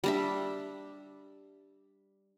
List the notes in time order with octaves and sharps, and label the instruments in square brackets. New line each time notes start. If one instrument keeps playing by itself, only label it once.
[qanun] G3 D4 E5